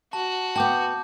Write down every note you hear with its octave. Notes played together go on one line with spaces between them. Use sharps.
F#4 A5
B3 G5 A5 D6 G6